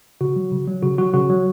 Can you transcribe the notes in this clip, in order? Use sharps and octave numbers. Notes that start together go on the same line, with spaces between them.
C#3 F#4
F#3
C#3
F#3
C#3 F#4
F#3 F#4
C#3 F#4
F#3